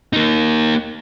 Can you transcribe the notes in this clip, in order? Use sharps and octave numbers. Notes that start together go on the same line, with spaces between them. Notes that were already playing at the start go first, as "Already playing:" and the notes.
A#3 D#4